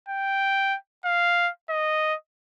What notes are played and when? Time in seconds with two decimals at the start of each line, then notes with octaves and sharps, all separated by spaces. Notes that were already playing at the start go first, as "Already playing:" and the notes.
0.09 G5
1.05 F5
1.70 D#5